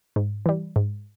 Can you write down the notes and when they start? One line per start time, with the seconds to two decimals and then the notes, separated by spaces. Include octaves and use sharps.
0.16 G#2
0.46 E3 G3
0.76 G#2